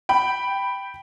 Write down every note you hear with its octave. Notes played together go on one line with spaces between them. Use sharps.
G5 B5